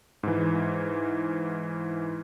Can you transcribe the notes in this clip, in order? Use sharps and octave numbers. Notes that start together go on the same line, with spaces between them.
G#2 E3